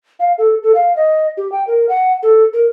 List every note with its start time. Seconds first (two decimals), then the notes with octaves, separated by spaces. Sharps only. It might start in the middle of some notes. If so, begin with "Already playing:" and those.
0.20 F5
0.38 A4
0.63 A4
0.75 F5
0.96 D#5
1.37 G4
1.52 G5
1.67 A#4
1.89 F#5
2.23 A4
2.53 A#4